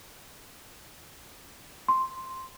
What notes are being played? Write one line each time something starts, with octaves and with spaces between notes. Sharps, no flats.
C6